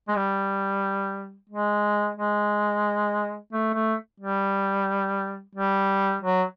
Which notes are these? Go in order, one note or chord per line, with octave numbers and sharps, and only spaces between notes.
G#3
G3
G#3
G#3
A3
A3
G3
G3
F#3